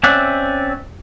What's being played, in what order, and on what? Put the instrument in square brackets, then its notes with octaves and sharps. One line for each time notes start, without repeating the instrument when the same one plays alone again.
[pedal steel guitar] C4 C#4 D5 E5 F#5